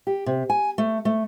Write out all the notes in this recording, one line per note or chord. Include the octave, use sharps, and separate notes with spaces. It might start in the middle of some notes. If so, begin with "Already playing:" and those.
G4
C3
G#5
A3
A3